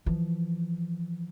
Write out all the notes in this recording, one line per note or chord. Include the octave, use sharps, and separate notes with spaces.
E3 F3